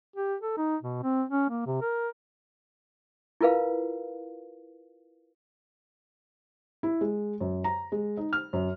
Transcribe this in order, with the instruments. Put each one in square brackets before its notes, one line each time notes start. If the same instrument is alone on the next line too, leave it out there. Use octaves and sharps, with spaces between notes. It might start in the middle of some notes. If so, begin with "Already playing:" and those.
[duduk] G4
A4
D#4
B2
C4
C#4
A#3
C3
A#4
[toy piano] E4 F4 A#4 B4 F5
[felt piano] E4
G#3
F#2
A#5
G#3
D#4
F6
F#2